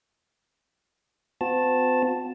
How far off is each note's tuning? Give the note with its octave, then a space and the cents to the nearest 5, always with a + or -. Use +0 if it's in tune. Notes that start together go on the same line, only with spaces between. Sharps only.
C4 -45 F#4 -45 A5 +0